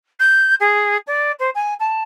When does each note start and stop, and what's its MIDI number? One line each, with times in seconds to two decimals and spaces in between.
0.19 0.54 91
0.59 0.97 68
1.06 1.31 74
1.39 1.49 72
1.54 1.74 80
1.79 2.03 81